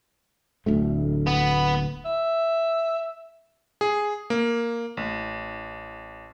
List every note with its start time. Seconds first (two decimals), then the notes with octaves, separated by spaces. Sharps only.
0.66 D1 D2 A3
1.27 B3
2.05 E5
3.81 G#4
4.30 A#3
4.97 A1